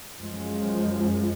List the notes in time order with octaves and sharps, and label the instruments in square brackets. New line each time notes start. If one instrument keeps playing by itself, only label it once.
[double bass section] F#2 F3 G#3